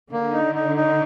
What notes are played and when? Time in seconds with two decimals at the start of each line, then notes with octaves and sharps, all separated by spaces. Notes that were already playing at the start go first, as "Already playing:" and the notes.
0.12 D3 A#3
0.33 D#4
0.55 D#4
0.76 D#4